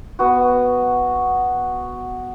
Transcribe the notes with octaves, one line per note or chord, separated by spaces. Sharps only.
B3 F#4